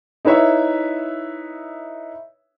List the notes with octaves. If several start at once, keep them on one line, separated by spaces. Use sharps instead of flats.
D#4 E4 B4 C#5 E5